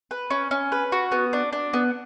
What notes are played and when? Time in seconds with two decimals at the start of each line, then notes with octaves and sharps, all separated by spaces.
0.11 B4
0.30 C#4
0.51 C#4
0.72 B4
0.92 F#4
1.12 B3
1.33 D4
1.53 D4
1.73 B3